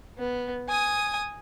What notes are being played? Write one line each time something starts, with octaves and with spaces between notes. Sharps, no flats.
B3
G#5 D#6